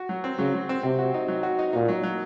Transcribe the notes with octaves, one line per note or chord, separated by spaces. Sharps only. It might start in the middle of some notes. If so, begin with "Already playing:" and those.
Already playing: F#4
F#3
C4
C#3 F#3
F#3
C4
C3 C4
F#4
D#4
F#3
F#4
D#4
A#2 D#4
F#3
F#3